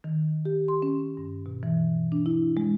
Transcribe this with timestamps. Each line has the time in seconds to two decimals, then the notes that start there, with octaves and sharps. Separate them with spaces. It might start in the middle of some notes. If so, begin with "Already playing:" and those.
0.04 D#3
0.45 G4
0.68 C6
0.82 C#4
1.17 G2
1.46 B2
1.63 E3
2.12 D4
2.26 E4
2.57 G#3